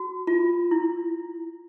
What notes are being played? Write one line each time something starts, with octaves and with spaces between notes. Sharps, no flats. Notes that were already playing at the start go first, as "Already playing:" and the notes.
Already playing: F#4
F4
E4